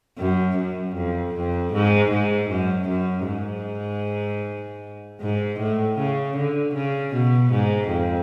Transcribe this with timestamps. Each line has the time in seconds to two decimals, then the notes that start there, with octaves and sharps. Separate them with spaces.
0.19 F#2
0.57 F#2
0.95 F2
1.34 F2
1.73 G#2
2.11 G#2
2.50 F#2
2.89 F#2
3.27 G#2
5.20 G#2
5.59 A2
5.98 C#3
6.36 D3
6.74 C#3
7.13 B2
7.52 G#2
7.90 F2